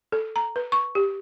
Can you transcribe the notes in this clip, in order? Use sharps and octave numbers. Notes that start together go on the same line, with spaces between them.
A4
A#5
B4
C#6
G4